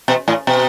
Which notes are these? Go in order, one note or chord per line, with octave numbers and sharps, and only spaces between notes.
B2
A2
B2